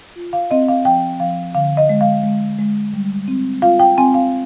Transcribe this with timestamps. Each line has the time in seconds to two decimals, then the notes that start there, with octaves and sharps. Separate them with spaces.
0.16 F4
0.33 F5
0.51 C4 D#5
0.68 F5
0.85 F3 G5
1.20 F3 F5
1.55 D3 F5
1.77 D#5
1.89 G#3
2.01 F5
2.24 G#3
2.59 G#3
2.93 G3
3.28 C4
3.62 F4 F5
3.79 G5
3.98 C4 G#5
4.14 F5